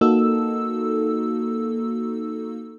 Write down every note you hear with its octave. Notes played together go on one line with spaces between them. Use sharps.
A#3 D#4 F#4 A4 E6